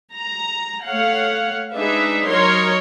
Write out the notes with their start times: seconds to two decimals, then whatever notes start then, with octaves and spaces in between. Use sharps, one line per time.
0.13 A#5
0.84 A3 C#5 F5 F#5
1.75 G#3 D4 D#4 G#4 B4 E5
2.27 F#3 D#4 A#4 C#5 C6